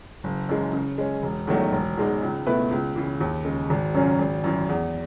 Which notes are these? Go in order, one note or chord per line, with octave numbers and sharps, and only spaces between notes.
F#1
F#2 E3 G#3
C#3
G#3 C#4
E1
E2 D#3 F#3 A3
E1
E2 B2 G#3 D#4
C#2
B2 A3 E4 B4
C#2
C#3 E3
D#2
C#3 G#3
G#1
F#2 C#3 F#3 C#4
G#1
F#2 E3
E2